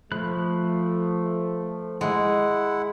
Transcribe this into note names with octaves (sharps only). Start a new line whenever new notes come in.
F3 A3 B5 F#6
G#3 E4 F#5